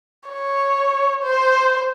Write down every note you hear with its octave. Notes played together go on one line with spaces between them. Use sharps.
C#5
C5